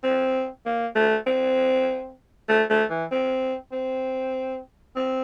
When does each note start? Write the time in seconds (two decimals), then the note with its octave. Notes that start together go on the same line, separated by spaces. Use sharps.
0.04 C4
0.66 A#3
0.95 A3
1.27 C4
2.49 A3
2.70 A3
2.90 E3
3.11 C4
3.72 C4
4.96 C4